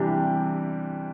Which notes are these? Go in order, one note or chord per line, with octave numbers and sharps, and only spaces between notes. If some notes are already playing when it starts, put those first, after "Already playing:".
Already playing: C3 E3 G3 D4 G4